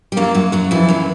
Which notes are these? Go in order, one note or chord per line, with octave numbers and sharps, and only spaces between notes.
G3
F#2 F#3 A#3
F#2 F#3
F#2 F#3
F2 E3 F3
F#2 F#3